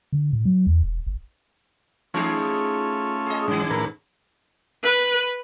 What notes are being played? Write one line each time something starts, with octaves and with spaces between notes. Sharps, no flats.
D3
A2
F#3
E2
E1
G1
E3 A3 C#4 D#4 F4 G#4
G#4 D#5
G#2 D#3 C#4
A2 A#4 B4
B4